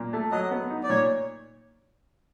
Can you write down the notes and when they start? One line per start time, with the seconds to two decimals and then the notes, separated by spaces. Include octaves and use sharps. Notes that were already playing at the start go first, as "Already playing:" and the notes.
Already playing: A#2
0.13 A3
0.32 F#3 D#5
0.51 B3
0.70 D#4
0.83 D5
0.89 A#2 C#5